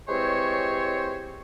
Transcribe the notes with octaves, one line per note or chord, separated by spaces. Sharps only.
E3 G#3 C4 G4 C5 C#5